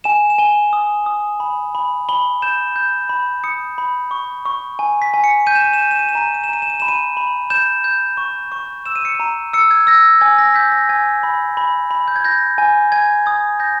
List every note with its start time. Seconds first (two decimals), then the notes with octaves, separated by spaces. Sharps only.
0.04 G#5 E7
0.30 E7
0.38 G#5 G7
0.73 D#6
1.06 D#6
1.40 B5
1.75 B5
2.09 B5 G7
2.42 G6 E7
2.76 G6
3.09 B5
3.44 D#6 C#7
3.78 B5
4.11 C#6
4.45 C#6
4.79 G#5
5.02 B6
5.14 G#5
5.24 C#7
5.47 G6 D#7
5.55 E7
5.64 D#7
5.73 E7
5.81 G6 D#7
5.91 E7
5.99 D#7
6.09 E7
6.15 A#5 D#7
6.26 E7
6.34 D#7
6.44 E7
6.49 A#5 D#7
6.62 E7
6.70 D#7
6.80 B5 E7
6.88 D#7
7.17 B5
7.50 G6 E7
7.84 G6
8.17 C#6
8.52 C#6
8.86 E6 E7
8.96 D#7
9.05 C#7
9.15 A#5 D#7
9.53 E6 C#7
9.71 G#6
9.87 E6 A#6
10.21 G#5 G#6
10.38 A#6
10.54 G6 B6
10.72 A#6
10.89 G#5 G#6
11.23 B5
11.57 B5
11.91 B5
12.08 G6
12.16 G#6
12.24 G6 A#6
12.58 G#5
12.92 G#5 G#6
13.26 D#6 G#6
13.60 G6 A#6